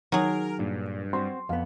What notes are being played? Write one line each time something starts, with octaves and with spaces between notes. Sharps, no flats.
D#3 F#3 G#4 A#4
G2 A#2
C4 F#4 C6
F2 B3 F5